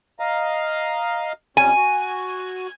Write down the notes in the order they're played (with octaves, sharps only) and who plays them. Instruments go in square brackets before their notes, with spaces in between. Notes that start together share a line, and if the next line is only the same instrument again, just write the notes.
[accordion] D#5 F5 A#5
[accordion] F2 G3 C#4 [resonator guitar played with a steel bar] G#5
[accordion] F#4